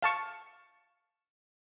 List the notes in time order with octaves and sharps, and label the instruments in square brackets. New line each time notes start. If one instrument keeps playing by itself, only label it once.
[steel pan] F5 A5 C#6